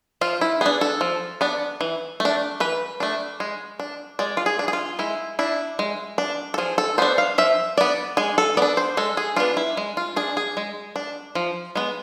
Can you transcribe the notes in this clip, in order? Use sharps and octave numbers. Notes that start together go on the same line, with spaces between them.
F3 F4
E4
B3 D4 G#4
A4
F3
B3 D4
E3
A3
D4
E3 B4
A3 D4
G#3
D4
G#3 D5
F4
G#4
D4
G#4
F4
G#3 E4
D4 E4
G#3
D4
A4
F3 G#4
A4
B3 D4 C5
F5
F3 E5
B3 D4 D5
G#3 G#4
A4
B3 D4 D5
C5
G#3 A4
G#4
B3 D4 F4
E4
G#3
F4
D4 G#4
G#4
G#3
D4
F3
G#3 B3